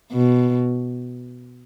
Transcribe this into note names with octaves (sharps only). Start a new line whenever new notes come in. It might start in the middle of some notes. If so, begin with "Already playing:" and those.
B2